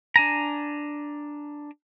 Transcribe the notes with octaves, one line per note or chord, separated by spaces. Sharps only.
D4 G#5 A#5